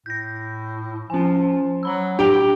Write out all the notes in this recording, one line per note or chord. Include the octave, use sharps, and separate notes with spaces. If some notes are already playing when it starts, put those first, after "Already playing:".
A2 G6 A#6
F3 C#4 G#5
F#3 A#5 B5 E6
A2 D4 G4 D7 G7